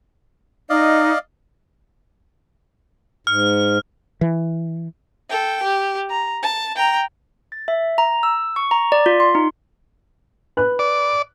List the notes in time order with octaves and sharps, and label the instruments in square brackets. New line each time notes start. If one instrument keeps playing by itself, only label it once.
[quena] D#4 [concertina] D5 D#5 F5
[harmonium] G#2 [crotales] F6
[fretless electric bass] E3
[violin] A4 G5
G4
A#5
A5
G5 A#5
[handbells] A6
E5
A#5
E6
C#6
A#5
D5
F4
C6
D#4
[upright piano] B4 F#6
[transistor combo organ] D5